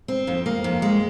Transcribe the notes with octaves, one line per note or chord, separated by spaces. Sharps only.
C4
F2
A#3
F2
G#3